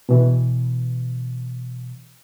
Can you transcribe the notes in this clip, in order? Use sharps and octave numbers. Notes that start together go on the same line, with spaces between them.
B2 E3